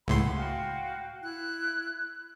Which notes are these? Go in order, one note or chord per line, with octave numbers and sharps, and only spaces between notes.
C#2 A2 F#5 G#5 B5 C6
F#4 F5 G5
E4 F#6